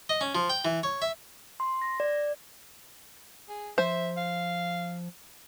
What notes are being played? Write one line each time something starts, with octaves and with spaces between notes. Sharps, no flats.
D#5
C#4
F3
G5
E3
C#5
E5
C6
A#6
D5
G#4
F3 C5 E5
F5